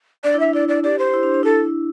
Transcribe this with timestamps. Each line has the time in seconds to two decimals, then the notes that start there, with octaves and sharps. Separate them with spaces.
0.24 D4 D5
0.34 E4
0.40 D4 E5
0.53 E4 D5
0.68 D5
0.83 G4 D5
0.99 C5
1.14 E4
1.23 D4
1.34 D4
1.43 E4 A4